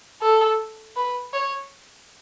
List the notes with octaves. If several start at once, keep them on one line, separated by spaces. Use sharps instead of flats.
A4
B4
C#5